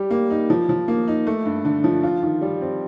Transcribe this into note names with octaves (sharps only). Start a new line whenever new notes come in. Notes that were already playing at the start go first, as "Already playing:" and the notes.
Already playing: G3 G4
A#3
D#4
F3
F3
A#3
D#4
A3
G2
D3
F3
F4
D#3
G3
C4